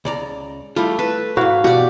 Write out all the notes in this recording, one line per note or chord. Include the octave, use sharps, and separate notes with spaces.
C#2 D5 A#5
G3 A3 E4 F4
A4 B4
G#2 E4 F#4 F5
B2 F#4 G4 D5